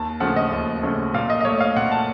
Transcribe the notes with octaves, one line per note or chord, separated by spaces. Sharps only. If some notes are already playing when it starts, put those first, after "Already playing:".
Already playing: D#2 A5
C#3 F3 A3 F#5
D#5
D#2
C#3 F3 A3
A#2 F5
D#5
D#5
A3 C#5
F5
A#2 F#5
A5